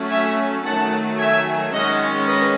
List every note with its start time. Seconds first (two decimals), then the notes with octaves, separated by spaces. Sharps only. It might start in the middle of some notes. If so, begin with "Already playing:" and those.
Already playing: F#3 A3 C#4
0.10 E5 G#5
0.64 D#3 F#3 A3 F#5 A5
1.19 E5 G#5
1.72 D#3 G#3 C#4 D#5 F#5
2.27 B4 D#5